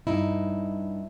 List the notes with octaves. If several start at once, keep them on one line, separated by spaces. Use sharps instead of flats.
G2 D#4 E4